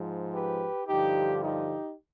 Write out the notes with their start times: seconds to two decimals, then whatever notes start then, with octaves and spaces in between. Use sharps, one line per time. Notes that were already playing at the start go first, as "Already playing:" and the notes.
Already playing: G#2 F3
0.33 G4 B4
0.88 G2 D3 F3 D#4 G4
1.42 D#4 G4